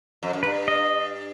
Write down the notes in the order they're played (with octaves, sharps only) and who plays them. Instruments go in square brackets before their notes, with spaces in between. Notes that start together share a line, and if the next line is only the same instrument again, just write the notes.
[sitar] F2
F#2
[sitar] G2 [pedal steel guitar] B4
[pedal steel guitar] D#5